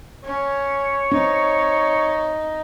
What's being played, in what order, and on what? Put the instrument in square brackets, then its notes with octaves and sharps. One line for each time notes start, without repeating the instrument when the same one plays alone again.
[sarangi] C#4 [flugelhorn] C#5
[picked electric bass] C4 C#4 [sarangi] D#4